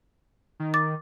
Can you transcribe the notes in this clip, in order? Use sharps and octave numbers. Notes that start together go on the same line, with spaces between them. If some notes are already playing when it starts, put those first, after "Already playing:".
D#3
D6 A6